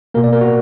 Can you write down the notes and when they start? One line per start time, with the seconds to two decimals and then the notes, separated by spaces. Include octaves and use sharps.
0.14 B2 A#3 A#4
0.24 D5
0.33 A#4
0.41 F#4